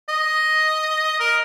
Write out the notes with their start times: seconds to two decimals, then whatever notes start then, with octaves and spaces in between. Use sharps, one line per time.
0.09 D#5
1.20 A#4